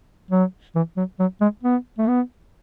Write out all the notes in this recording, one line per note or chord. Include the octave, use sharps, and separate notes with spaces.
F#3
E3
F#3
F#3
G#3
B3
A3
B3